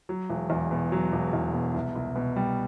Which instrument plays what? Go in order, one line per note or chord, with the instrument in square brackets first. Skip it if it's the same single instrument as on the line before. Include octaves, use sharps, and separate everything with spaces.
[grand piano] F#3
E1
E2
B2
F#3
E1
E2
B2
C2
C2
B2
G3